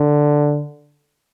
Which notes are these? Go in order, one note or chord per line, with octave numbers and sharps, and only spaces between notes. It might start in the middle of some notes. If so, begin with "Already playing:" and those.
Already playing: D3